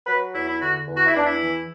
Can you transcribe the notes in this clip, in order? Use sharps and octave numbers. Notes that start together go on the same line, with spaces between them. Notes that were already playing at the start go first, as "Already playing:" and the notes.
F#3 B4
E2 E4
E4
D3 F#4
E2
F#4
E4
E2 D4
E4
E3